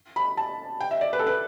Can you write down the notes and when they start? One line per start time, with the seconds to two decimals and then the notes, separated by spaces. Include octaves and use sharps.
0.16 B5
0.37 A5
0.80 G5
0.91 E5
1.01 D5
1.13 B4
1.19 A4
1.27 B4